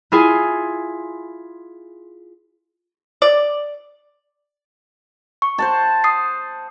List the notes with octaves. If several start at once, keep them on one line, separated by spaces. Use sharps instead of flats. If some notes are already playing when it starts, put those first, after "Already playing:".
E4 F4 G#4 G#5 C6
D5
C#6
C5 F#5 A5
D#6 C7